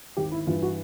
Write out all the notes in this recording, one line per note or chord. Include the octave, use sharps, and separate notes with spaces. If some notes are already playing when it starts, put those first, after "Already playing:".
G#1 G4
E4
G2 E3 F4
F#4